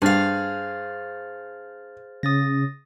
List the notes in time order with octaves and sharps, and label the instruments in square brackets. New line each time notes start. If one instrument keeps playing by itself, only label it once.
[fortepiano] G2 [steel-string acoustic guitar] G#4 F5 [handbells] C5 F6 A6
[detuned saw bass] C#3 [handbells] D#6 A6 A#6